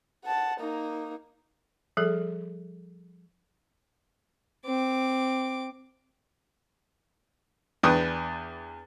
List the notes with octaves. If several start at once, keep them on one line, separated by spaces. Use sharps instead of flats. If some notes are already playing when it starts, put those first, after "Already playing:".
F#5 A5
A#3 D#4
F3 G3 G#4 A4
C4 D6
E2 D4 B4 G5 C#6 D#6